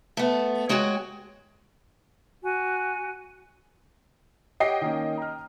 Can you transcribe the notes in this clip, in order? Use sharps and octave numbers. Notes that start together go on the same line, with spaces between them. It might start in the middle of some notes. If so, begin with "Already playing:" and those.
A3 B3
G#3 F#4 C#5 G5 G#5
F#4 G#5
G4 C#5 D#5 F#5 G5 C7
D#3 A#3 C#4
A#5 F6